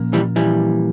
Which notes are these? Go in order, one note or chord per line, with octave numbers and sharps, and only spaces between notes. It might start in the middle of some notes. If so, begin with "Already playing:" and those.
Already playing: A#2 F3 A#3 C#4
E3 G3
E3 G3